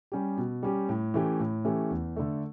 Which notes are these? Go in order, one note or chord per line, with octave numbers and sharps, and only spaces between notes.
G3 C#4 G4
B2
G3 C#4 G4
A2
E3 A3 C#4 G4
A2
E3 A3 C#4 G4
E2
D3 A3